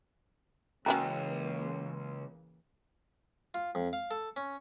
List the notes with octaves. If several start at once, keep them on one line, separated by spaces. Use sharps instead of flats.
C#2 C#3 E3 A#3 C#4 F#4 A#4 G5
F4
F2
F5
A4
C#4